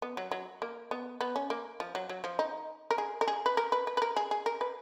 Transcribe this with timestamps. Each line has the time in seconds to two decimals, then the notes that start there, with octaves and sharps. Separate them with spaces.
0.02 B3
0.17 F#3
0.31 F#3
0.62 A#3
0.91 B3
1.21 B3
1.36 C#4
1.50 A#3
1.80 F3
1.95 F#3
2.09 F#3
2.24 F3
2.39 D#4
2.91 A#4
2.98 G#4
3.21 A#4
3.28 G#4
3.46 B4
3.57 A#4
3.72 B4
3.87 B4
3.97 B4
4.02 A#4
4.16 G#4
4.31 G#4
4.46 A#4
4.61 B4